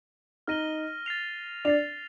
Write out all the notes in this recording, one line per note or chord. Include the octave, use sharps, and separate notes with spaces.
D#4 D#5 F6 A#6 D#7 G7
A6 C7 F7
D4 D5 A6 C7 F7